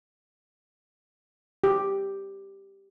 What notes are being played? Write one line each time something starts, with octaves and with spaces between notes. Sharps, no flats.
G4